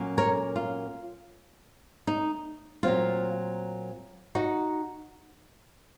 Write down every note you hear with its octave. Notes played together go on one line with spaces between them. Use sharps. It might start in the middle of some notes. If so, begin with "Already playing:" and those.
Already playing: A#2 F#3 A#3 C#4
A#4 C#5
F4
D#4
A#2 F#3 C4 F4
D#4 F#4